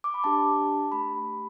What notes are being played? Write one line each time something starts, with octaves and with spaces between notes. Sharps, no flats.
D6
B5
D4 G4 A5
A3 G4 B5